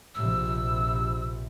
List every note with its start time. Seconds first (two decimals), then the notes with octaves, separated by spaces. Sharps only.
0.15 A#1 C3 E6